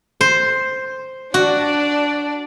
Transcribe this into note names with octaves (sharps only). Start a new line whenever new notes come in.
C5
D4 F#4 D5